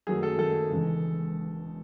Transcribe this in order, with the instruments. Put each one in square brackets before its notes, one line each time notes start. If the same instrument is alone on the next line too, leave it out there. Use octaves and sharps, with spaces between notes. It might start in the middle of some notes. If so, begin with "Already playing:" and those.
[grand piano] F#2 D#3 F#3 A3 G#4
A4
F#2 D#3 F#3 A3 A4
E1 E2 C#3 G#3